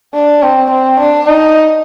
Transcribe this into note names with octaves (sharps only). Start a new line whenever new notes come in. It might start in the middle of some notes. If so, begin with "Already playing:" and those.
D4
C4
C4
D4
D#4